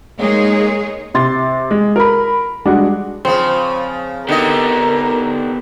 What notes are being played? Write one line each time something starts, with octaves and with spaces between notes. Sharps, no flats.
G#3 A#3 D#4 G#4 C#5
C3 C6 A6
G#3
A#4 B5
G3 G#3 D4 F#4
C#3 F3 C4
D3 B3 D#4 G4 A#4 D#5